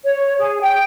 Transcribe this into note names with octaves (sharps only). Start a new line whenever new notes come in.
C#5
G#4
G5